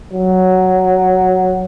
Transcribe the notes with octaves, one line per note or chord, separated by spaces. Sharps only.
F#3